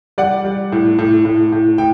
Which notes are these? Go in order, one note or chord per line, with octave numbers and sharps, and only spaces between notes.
G3 D5 F#5
G3
A2
A2
A2
A2
A2 G5